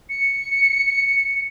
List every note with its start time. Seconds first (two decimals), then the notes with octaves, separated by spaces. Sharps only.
0.10 C#7